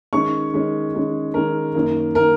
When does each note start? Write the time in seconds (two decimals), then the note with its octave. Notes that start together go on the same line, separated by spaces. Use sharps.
0.13 D#3 G#3 C#4 C#6
0.53 D#3 G#3 C#4
0.94 D#3 G#3 C#4
1.34 D#3 G#3 C#4 A#4
1.74 F#2 D#3 A#3
2.15 D#3 A#3 A#4